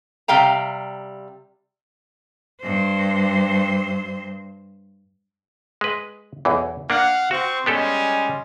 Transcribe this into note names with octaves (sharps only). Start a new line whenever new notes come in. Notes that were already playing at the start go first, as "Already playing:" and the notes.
C3 G3 F5 G5 A#5
G2 C5
G#3 B4
B1 E2 E3
A#3 D4 F5 F#5
C4 F#4 C5 C#6
G3 G#3 B3 C#4 G4 A4